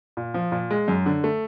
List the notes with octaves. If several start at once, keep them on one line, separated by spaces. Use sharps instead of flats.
A#2
F3
A#2
G#3
F#2
D3
A3